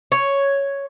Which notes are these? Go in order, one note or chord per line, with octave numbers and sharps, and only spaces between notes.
C#5